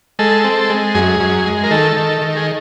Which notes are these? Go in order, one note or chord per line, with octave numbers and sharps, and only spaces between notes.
G#3 A4
C4
G#3
F#2 G#4
F#2
G#3
A#4
D#3 A4
D#3
D#3
G#4